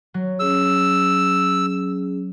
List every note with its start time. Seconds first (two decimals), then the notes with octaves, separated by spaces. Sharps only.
0.14 F#3
0.40 C#4 G#4 E6